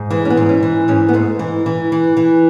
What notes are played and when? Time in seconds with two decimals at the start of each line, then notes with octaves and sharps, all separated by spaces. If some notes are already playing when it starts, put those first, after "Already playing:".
Already playing: G#2
0.10 E3 G#3
0.25 C#4
0.30 B3
0.37 G#2
0.49 C#4
0.63 E3
0.88 G#2 C#4
1.09 B3
1.13 G#2 A3
1.39 E3
1.66 E3
1.92 E3
2.17 E3